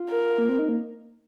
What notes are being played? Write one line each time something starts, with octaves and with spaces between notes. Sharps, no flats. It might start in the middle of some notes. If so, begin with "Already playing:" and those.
Already playing: F4
A#4
A#3
C4
D#4
A#3